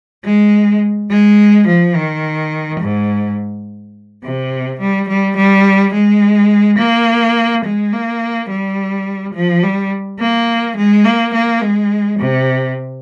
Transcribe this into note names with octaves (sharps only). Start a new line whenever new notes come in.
G#3
G#3
F3
D#3
G#2
C3
G3
G3
G3
G#3
A#3
G#3
A#3
G3
F3
G3
A#3
G#3
A#3
A#3
G#3
C3